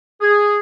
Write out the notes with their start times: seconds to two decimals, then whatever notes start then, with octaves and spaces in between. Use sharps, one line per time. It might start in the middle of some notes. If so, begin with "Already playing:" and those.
0.21 G#4